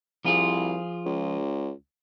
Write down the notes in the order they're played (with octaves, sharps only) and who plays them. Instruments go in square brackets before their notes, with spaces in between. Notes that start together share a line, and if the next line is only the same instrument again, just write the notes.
[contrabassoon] C2 [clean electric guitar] F3 F4 G#4
[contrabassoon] C#2